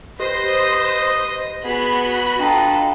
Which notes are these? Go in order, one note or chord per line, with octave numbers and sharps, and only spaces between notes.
G4 B4 C5 D#5 D#6
B3 F#4 G#4 B5
D4 F4 A4 D#5 G5 A#5